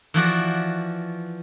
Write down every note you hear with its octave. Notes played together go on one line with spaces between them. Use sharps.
E3 F3 F#4 D5